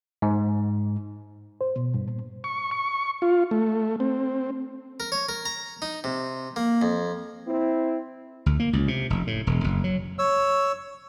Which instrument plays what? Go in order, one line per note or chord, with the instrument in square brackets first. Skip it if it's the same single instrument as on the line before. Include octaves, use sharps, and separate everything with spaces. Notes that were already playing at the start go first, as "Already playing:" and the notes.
[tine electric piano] G#2
[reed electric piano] C5
B2
G2
A#2
[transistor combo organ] C#6
C#6
F4
A3
C4
[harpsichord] A#4
C#5
A#4
A#5
D#4
C3
A#3
F2
[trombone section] C4 E4
[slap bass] D2
A#3
C#2
C3
F1
A2
E1
F#1
F#3
[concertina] C#5 E6